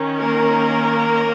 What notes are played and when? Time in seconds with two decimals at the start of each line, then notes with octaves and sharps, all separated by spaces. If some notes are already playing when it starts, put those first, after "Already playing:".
Already playing: D#3 C#4
0.19 A#3 A#4